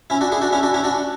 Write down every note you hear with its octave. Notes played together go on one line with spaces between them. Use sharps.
C#4 E4
D4 F#4
E4 G#4
D4 F#4
C#4 E4
D4 F#4
C#4 E4
D4 F#4